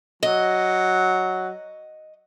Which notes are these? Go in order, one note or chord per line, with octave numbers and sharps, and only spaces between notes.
F#3 D#5